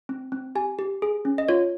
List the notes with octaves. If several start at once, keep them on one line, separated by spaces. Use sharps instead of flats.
C4
C4
G4 G#5
G4
G#4
C#4
D#5
F4 C#5